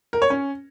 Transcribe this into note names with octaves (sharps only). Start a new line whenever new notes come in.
A#4
C#5
C#4